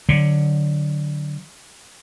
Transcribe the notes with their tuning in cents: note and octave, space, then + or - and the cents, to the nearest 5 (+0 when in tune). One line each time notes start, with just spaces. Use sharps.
D3 +10 F#3 +0